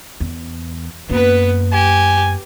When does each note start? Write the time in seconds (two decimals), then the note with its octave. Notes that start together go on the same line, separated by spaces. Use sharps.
0.20 E2
1.10 F#2 A#3 B3 B4
1.73 G4 G#5